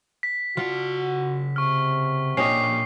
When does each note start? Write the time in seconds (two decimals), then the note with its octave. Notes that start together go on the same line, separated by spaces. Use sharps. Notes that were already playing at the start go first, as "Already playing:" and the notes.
0.23 B6
0.57 C#3 F4 F#4 F#5 A5
1.56 C3 C#6 F6
2.37 A#2 A#3 C#4 D4 G4 D#5 C7